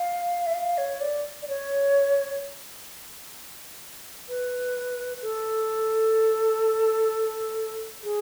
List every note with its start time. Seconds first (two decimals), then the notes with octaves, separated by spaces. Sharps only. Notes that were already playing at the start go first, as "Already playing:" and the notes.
Already playing: F5
0.46 E5
0.54 F5
0.78 C#5
1.01 D5
1.42 D5
1.48 C#5
4.29 B4
5.22 A4
8.04 G#4